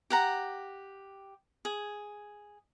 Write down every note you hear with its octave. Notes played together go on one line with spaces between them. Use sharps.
G4 F#5 A#5
G#4